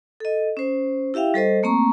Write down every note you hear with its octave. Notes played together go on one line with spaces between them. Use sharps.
A4 D#5
C#4 C5
E4 G4 E5 F5 G5
G3 A4 C5 D#5
A3 A#3 C4 A#5 C#6